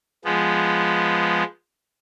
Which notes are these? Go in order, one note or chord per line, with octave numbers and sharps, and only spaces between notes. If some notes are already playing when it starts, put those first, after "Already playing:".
F3 G#3 B3